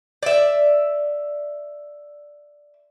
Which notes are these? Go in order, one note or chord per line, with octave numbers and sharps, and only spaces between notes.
D5 E5